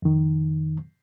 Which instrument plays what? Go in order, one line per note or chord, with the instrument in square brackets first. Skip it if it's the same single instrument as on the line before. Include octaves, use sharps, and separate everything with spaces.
[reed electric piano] F2 D#3